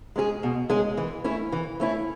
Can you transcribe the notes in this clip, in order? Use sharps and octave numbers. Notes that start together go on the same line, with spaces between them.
G#3 C#4 G#4
B2
G#3 C#4 G#4
E3
A3 C#4 E4
E3
A3 C#4 E4